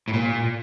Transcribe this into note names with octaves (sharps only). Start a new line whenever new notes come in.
A2
A#2